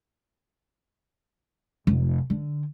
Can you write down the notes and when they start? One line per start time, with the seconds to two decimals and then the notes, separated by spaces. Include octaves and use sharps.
1.87 F1
2.30 D3